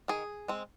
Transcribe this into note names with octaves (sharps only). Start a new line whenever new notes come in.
D#3 G#4
G#3 C4